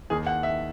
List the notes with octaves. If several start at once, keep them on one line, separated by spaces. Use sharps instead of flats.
D#2 D#3 G#4
F#5
E5